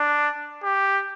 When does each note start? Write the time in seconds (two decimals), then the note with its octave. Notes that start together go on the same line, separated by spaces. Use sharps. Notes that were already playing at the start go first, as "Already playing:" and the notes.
Already playing: D4
0.63 G4